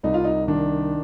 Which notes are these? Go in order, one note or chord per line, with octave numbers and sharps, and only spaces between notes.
C2 D#4
F4
D#4
D#3 D4